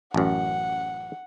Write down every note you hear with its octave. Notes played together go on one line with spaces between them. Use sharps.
A1 F#2 F#5